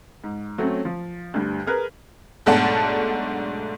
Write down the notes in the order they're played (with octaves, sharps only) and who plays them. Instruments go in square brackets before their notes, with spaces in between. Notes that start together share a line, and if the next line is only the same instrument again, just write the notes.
[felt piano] G#2
F#3 A3 C4 C#4
F3
D2 G2
G#4 A#4 B4
[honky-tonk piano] B1 G#2 A3 D4 F#5 A5